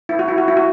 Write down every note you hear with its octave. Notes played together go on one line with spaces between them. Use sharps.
E4
F#4
E4
F#4
E4
F#4